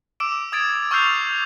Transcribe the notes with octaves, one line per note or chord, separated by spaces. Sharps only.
D6 E6 D7 E7
D#6 G#6 A6 D7
C#6 E6 F6 G6 C7 F7